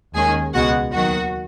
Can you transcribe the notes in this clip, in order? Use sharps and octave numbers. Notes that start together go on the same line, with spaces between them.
D#2 D#3 G#3 C#4 G#4 G#5
C#2 B2 G#3 B3 F#4 F#5
D#2 D#3 F#3 F#4 F#5